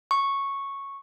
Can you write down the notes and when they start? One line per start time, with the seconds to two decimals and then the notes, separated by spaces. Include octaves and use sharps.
0.11 C#6